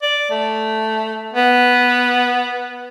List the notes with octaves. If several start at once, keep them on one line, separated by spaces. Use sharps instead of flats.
D5
A3
B3